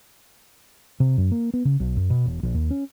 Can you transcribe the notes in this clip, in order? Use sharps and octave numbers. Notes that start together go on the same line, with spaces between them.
C3
F#2
A#3
B3
C#3
B1
F#2
B2
E1
A#1
D#2
C#4